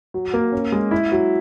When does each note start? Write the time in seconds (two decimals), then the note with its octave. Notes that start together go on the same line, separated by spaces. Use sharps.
0.14 F#3
0.34 A#3
0.52 C#4
0.72 G#3
0.91 E4
1.12 F#3